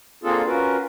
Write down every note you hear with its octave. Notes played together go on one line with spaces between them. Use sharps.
A#3 C4 D4 F4 G#4 A4
C#4 F4 F#4 A#4 B4